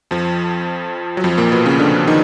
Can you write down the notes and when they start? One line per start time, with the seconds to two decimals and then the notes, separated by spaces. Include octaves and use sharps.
0.11 F2 F3
1.17 F#3
1.24 F2 F3
1.37 A#2 A#3
1.52 B2 B3
1.66 C#3 C#4
1.79 D3 D4
2.07 D#3 D#4